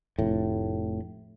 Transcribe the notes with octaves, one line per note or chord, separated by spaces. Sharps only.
F1 A2